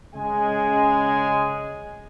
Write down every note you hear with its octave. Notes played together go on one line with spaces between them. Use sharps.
C#3 G#3 G#5